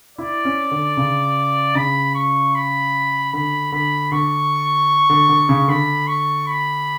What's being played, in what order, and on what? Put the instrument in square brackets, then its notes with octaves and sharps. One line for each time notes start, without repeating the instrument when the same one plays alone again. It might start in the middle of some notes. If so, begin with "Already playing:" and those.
[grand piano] E4 [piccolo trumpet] D5
[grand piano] C#4
D3
C#3
[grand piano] C#3 [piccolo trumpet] B5
[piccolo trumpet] C#6
B5
[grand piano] D3 [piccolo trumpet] B5
[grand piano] D3 [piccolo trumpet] B5
[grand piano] D3 [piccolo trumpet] C#6
[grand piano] D3
D3
C#3
[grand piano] D3 [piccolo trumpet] B5
[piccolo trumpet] C#6
B5